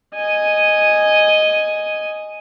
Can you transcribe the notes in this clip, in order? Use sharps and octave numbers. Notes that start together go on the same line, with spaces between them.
D#5 G#5